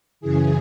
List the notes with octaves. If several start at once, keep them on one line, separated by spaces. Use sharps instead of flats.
F#2 C#3 E3 G#4